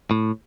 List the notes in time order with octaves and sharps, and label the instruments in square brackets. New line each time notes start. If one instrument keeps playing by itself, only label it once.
[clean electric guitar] A2